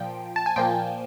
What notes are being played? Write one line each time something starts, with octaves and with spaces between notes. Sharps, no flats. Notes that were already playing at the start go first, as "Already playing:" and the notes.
Already playing: A#2 F3 G5
A5
G#5
A#2 F3 A#3 G5